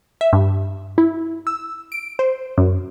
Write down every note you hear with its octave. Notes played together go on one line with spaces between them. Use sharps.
E5
G2
E4
E6
D7
C5
F#2